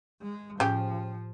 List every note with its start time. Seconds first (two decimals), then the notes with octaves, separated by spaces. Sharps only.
0.22 G#3
0.60 A2 C#3 F3 G4